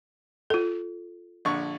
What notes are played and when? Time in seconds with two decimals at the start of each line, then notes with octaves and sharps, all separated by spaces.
0.50 F4 A4
1.45 A#1 D3 C#6